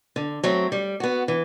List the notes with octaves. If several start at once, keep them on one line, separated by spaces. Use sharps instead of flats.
D3
F#3 A3 C4
G3
B3 F#4
E3